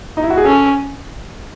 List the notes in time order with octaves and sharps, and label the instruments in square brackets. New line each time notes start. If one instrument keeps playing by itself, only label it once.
[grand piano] D#4
E4
F#4
G#4
[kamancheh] C#4 [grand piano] A4